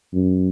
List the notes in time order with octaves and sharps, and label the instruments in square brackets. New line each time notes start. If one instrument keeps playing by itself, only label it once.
[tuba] F#2